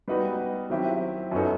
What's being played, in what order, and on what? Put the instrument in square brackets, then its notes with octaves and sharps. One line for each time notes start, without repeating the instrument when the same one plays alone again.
[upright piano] G3 B3 D#4 F#4 B4
D#3 F#3 C4 E4 G4
F#2 F#3 B3 D#4 A4